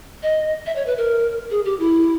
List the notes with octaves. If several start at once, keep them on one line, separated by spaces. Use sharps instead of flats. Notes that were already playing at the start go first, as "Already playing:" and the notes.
D#5
E5
C#5
B4
A#4
G#4
G4
E4